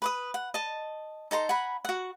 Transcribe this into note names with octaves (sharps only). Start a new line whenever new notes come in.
B4 D6 D#6
F#5
D#5 A5
D#4 A4 A#5 C6
F#5 G#5 A#5 B5
F#4 F#5